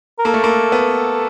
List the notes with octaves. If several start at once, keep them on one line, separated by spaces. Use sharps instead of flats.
A#4
A#3 A4
A3
A#3
B3